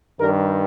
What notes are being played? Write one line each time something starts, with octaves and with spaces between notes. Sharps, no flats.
G2 D#3 G3 A#4